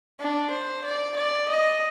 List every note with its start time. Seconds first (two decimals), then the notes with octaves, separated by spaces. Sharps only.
0.20 D4
0.51 C5
0.84 D5
1.16 D5
1.49 D#5